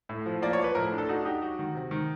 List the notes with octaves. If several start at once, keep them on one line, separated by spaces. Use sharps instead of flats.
A2
F3
A#3 D5
C#5
F3
B4
A2 A#4
D4
A4
D#4 F#4
D#4 G4
F#3 F#4
D#3
C3
D#3